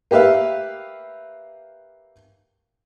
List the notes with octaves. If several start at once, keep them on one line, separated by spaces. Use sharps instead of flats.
A#3 G4 B4 E5 F5